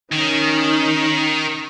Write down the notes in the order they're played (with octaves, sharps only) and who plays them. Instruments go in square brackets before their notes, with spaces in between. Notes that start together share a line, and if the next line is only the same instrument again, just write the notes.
[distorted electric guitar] D#3 [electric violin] C#4 D#4